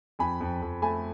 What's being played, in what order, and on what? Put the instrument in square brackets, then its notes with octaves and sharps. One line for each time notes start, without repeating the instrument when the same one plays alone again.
[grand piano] F2 G#5 B5
F2
F2
A3 G#5 B5